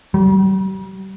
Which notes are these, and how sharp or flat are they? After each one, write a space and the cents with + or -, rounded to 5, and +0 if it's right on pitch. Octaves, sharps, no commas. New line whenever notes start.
G3 -35